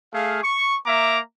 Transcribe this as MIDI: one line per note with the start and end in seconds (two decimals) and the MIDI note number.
0.14 0.40 57
0.14 0.40 68
0.14 0.40 77
0.43 0.77 85
0.86 1.19 58
0.86 1.19 76
0.86 1.19 82
0.86 1.19 86